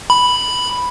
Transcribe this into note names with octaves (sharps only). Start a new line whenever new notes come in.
B5